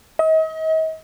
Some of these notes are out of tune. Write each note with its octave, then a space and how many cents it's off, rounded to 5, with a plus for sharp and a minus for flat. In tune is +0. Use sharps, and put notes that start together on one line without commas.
D#5 +40